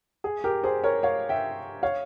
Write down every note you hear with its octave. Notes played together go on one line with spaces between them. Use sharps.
G#4
G4 A#4
G#4 C5
A#4 C#5
C#5 F5
E5 G5
C#5 F5